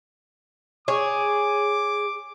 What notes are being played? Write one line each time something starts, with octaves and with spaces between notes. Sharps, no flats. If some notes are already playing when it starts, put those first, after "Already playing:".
G#4 C#5 D6